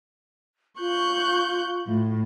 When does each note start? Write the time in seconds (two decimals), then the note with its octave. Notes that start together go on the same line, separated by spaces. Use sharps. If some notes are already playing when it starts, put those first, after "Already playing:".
0.79 F4 C#6 F#6 G6
1.87 A2